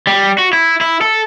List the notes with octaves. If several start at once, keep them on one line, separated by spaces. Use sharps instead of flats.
G3
F#4
E4
E4
A4